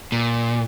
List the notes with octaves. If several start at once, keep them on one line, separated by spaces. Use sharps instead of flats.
A#2